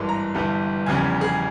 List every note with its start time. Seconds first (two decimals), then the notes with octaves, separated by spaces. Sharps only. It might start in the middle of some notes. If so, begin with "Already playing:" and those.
Already playing: G#1 G2 E3 G#3 C6
0.09 A#5
0.35 G1 G2 E3 G3
0.86 F1 E2 C#3 G3 G#5
1.21 G#4